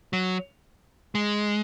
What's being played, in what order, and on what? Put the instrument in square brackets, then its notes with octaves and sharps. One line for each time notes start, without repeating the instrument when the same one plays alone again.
[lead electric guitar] F#3
G#3